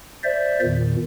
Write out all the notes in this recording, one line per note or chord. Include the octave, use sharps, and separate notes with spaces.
C5 D5 E5
E2 A#2 D#3